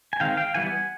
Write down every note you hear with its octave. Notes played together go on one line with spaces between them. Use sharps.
G#5
D#3 G#3 C4 F5 G5
F5 G5
E3 G3 B3 F#5 G#5